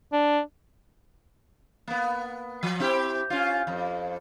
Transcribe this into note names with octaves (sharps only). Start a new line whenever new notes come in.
D4
A#3 B3
F3
C4 E4 G4
C#4 F4
F2